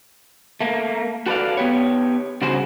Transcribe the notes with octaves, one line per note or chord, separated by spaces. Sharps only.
A3 A#3
F#4 A4 B4 C5 D5 F5
B3 G4 C#5
C#3 G3 F#4 G#4 C5